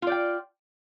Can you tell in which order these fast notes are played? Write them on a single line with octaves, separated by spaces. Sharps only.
F4 D5 G5